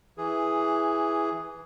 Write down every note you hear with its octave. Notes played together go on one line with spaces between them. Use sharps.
E3 G#4